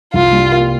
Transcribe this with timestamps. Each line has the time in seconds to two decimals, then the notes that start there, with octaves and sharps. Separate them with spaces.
0.14 C2 F4
0.33 G3
0.52 A#3